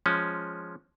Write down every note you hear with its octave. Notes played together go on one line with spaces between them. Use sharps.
F3 G#3 C#4